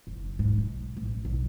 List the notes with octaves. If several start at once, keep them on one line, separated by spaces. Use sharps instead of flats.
F#1
G#2
B1
A1
B1